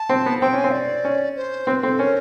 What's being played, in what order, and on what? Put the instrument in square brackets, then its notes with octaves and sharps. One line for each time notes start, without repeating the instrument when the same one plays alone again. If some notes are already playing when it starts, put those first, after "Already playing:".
Already playing: [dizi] A5
[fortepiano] C4
B3
[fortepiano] C4 [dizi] G5
[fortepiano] C#4 [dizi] G#5
[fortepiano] C4
[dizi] D5
[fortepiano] C#4
[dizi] C5
[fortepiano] C4 [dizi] B4
[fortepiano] C4 [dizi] A4
[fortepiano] C#4 [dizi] A#4